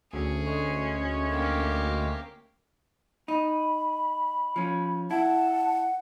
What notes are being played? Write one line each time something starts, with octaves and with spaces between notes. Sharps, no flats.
D2 C#4 G#4
G#3 C#5
A#3 G4
D#4 B5
F3 C#4
E4 F#5 A5